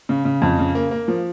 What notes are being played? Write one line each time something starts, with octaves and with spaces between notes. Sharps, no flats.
C#3
C#3
F2
C#3
A#3
A#3
F3